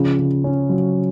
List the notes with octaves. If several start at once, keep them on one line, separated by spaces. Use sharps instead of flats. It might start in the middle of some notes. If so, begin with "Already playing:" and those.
Already playing: C#3 F3
C#3
C#4
F#3